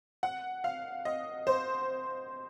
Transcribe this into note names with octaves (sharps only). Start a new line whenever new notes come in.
F#5
F5
D#5
C5